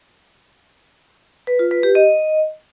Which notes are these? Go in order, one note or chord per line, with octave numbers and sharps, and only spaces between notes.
B4
F4
B4
G4
D#5